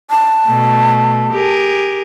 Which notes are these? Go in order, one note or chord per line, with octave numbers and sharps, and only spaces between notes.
A5
B2 A3
G4 G#4 A#4